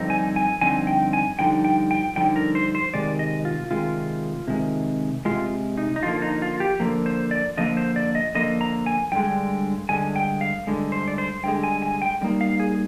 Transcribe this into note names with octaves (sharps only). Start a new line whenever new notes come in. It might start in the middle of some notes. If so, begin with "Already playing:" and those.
Already playing: G2 D3 F3 C4 D#4
G#5
G#5
G2 D3 F3 C4 D#4 G#5
G5
G#5
G2 D3 F3 D#4 G5
G5
G5
G2 D3 F3 D#4 G5
A#4
C5
C5
C3 D#3 G#3 D5
D#5
F4
C3 D#3 G#3 F4
C3 D#3 G#3
C3 D#3 G#3 F4
D#4
D#4
D3 F3 A#3 F4
D#4
F4
G4
D3 F3 A#3
C5
D5
D3 F3 A#3 D#5
C5
D5
D#5
D3 F3 A#3 D#5
A#5
G#5
G2 D3 G#3 G5
G2 D3 G#3 G#5
G5
F5
G2 D3 G#3
C5
D5
C5
G2 D3 G#3 G5
G#5
G#5
G5
D3 G3 A#3 D#4
F5
G#4